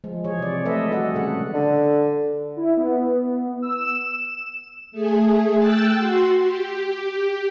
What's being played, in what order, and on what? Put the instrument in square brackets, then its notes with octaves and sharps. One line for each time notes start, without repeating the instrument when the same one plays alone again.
[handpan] F3 G#3
E3 G#4 C#5
C3 D5
G#3 A3 A4 B4 D#5 E5
G3 F#4 A4 D#5 E5 F#5
A#2 C#3 G#3 G#4 A4 F#5
[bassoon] D3
[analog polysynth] E4
B3
E6
E7
[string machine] A3 G#4
G5 E6 F#6 A6
F#4 C6
G4